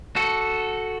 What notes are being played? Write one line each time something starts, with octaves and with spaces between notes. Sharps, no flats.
F#4 A4